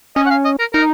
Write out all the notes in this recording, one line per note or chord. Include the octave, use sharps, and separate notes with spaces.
C#4 D#5
F#5
F5
D#5
A#4
D#4 A#4